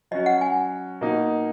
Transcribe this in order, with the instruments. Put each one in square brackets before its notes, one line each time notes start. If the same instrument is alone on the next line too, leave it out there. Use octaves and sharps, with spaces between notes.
[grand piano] F#3 C#4 F#4 [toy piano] D#5
[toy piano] F#5
G#5
[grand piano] B2 A#3 D#4